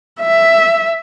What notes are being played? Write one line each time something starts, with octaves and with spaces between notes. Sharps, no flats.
E5